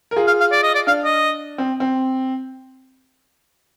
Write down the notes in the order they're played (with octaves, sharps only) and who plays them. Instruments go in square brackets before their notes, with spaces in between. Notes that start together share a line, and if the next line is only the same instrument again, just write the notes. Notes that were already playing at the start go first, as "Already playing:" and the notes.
[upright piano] A#4
F4 G#4
[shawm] F5
F5
D5
D#5
D5
[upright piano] D4 [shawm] F5
[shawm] D#5
[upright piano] C4
C4